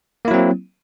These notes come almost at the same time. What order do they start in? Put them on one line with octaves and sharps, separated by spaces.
A#3 E4 F#3 C4